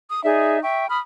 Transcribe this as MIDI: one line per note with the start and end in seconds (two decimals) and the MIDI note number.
0.10 0.23 87
0.24 0.59 63
0.24 0.59 68
0.24 0.59 74
0.24 0.59 76
0.62 0.87 76
0.62 0.87 79
0.62 0.87 85
0.89 0.98 83
0.89 0.98 87
0.89 0.98 89